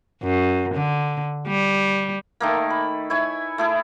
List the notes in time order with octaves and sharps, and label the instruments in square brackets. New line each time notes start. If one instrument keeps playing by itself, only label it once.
[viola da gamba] F#2
D3
G3
[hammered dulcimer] D#3 A3 A#3
B5
E4 C#5 G#5
A3 E4 G#4